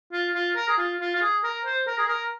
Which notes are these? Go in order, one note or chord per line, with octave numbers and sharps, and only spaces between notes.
F4
F4
A#4
G#4
F4
F4
F4
G#4
A#4
C5
A#4
G#4
A#4